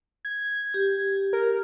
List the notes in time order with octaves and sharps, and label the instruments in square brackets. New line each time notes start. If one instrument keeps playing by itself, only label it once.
[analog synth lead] G#6
[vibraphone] G4
[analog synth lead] A#4